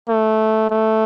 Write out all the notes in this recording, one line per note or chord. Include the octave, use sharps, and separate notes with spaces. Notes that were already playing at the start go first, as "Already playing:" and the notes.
A3
A3